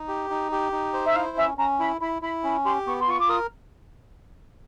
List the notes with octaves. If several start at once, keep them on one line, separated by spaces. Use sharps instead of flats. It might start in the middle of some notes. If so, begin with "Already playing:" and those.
Already playing: D#4
G4
D#4
G4
D#4
C5
E5
E4 F5
C#4 E5
C#4 A#5
E4 B5
E4 B5
E4 B5
C#4 B5
G4 C6
B3 C#6
C6
F4 C#6
D6
A#4 D#6